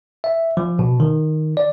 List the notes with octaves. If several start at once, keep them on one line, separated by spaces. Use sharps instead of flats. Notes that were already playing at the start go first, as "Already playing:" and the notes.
E5
F3
B2
D#3
D5